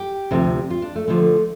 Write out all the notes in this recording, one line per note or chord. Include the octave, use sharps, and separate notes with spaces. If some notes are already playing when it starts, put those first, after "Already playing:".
Already playing: G4
D2 C3 F3
F4
D4
A3
D2 D3 F3 A3